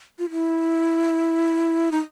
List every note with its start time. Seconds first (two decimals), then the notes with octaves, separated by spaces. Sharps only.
0.19 F4
0.31 E4
1.92 D#4